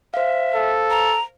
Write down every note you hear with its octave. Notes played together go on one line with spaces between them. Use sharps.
C5 E5 F5
A4
A#5